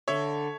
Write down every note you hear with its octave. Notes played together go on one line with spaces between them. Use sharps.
D3 C#5 E5